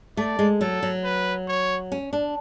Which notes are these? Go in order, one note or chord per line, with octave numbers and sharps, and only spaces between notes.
A3 D5
G#3
F#3 A4
F#3
B4
C#5
C#4
D4